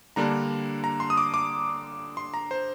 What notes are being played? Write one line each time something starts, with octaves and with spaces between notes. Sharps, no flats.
D3 G3 A#3 D4 A#5
A#5
C6
D#6
D6
D6
C6
A#5
C5